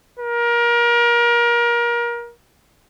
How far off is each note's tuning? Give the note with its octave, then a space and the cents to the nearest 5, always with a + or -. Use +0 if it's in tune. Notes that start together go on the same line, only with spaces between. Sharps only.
A#4 +30